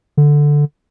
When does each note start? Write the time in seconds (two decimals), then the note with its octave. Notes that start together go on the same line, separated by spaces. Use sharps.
0.17 D3